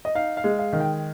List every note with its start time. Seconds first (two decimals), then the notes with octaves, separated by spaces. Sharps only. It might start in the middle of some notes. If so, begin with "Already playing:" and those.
0.05 D#5
0.15 D#4 F5
0.37 F5
0.44 G#3
0.59 F5
0.73 D#3
0.80 G5